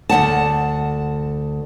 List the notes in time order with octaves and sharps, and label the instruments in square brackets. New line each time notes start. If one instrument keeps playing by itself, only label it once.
[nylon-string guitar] D2 F#3 F#5 A5